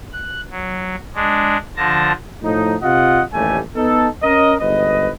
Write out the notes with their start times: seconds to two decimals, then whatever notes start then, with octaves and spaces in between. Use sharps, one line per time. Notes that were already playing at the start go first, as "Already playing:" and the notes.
0.12 F#6
0.51 F#3
1.15 G#3 D4
1.76 D3 F3 A5 A#6
2.43 A2 F3 D#4
2.83 C3 F4 D#5 F#5
3.34 A1 D#2 G3 A3 G#5
3.76 B3 D#4 A4
4.23 C#4 A#4 D#5
4.61 G1 G#2 B4 D#5